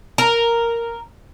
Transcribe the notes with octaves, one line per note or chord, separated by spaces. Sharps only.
A#4